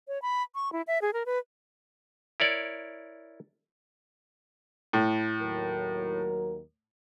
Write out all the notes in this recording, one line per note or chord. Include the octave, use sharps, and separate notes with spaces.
C#5
B5
C#6
E4
E5
G#4
A#4
B4
E4 A#4 C#5 D5
A2
D#2 F#3 A#4